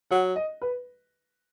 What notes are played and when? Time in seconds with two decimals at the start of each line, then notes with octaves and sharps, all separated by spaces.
0.11 F#3 F#5
0.36 D#5
0.62 B4